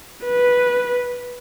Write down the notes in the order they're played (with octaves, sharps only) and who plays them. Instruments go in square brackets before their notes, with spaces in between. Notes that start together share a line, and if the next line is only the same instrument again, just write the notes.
[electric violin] B4